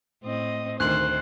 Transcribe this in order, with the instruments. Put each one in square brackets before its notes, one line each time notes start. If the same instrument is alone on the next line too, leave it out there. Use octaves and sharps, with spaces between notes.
[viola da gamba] A2 C4 D#5
[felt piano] D2 D#3 [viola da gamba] C5 [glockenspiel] F#6 F#7